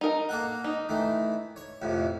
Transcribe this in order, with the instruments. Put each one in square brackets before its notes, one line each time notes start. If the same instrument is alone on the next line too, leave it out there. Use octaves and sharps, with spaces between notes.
[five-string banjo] D#4 A#4
[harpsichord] A#3 A4 F#5
[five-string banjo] D#4
[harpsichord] D#3 E3 A3
C#5
A1 F2 C3